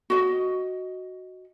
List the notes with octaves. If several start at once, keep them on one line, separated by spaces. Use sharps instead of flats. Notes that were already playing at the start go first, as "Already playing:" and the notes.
F#4 D#5